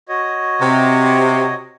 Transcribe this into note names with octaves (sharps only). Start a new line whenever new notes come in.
F#4 C#5 D#5
C3